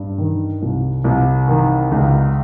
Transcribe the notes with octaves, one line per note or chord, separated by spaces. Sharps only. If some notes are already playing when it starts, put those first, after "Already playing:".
Already playing: G2
D#3
C2
C2
D#3
C#2